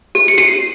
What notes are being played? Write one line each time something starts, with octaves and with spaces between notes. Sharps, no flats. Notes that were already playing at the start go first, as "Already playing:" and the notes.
G4
C#7
G4 C7 D#7